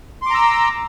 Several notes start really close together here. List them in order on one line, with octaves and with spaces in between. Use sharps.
C6 D6 A#5 E6